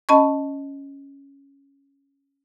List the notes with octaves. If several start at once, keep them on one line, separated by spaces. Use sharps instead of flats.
C#4 D#5 A5 B5 C#6